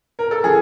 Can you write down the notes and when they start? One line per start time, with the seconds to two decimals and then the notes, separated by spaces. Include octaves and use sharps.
0.19 A#4
0.31 A4
0.43 C#3 F3 G#4